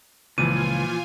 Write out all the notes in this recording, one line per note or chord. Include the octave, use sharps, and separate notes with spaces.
C#2 A#2 E3 F3 F4 G#5 D#7